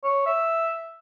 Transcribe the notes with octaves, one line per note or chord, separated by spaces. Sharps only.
C#5
E5